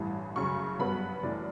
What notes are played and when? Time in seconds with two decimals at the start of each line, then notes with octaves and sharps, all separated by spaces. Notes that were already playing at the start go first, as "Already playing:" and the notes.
Already playing: A1 G2 E3
0.36 F#2 C#3 F#3 C#6
0.79 G2 F#3 B3 B5
1.23 F#2 E3 A3 D5